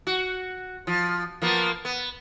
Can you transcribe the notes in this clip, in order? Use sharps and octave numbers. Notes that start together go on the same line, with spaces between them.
F#4
F3
F3 A#3 B3
B3